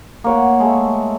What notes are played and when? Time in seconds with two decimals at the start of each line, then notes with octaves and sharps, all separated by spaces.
0.24 A#3 C#5 F#5
0.60 G#3 A3 E5